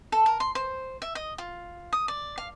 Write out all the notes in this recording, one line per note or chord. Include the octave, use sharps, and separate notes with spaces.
A4
A#4
C6
C5
E5
D#5
F4
D#6
D5
F5